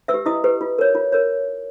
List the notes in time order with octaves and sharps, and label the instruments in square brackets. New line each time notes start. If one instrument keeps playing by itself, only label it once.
[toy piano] B4 E5 E6
G4
E4 D#5 D#6
G4 B4
F4
A#4 C#5
F4
A#4 C#5